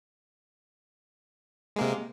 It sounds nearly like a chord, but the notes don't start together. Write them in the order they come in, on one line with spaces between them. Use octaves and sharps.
G#3 A#3 C3